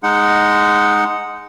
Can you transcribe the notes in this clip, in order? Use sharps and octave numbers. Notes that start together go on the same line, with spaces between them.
G#3 D#4 F#5